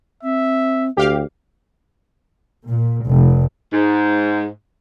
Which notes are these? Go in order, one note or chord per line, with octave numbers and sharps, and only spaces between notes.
C4 E5
D2 G4 F5
A#2
F1
G#2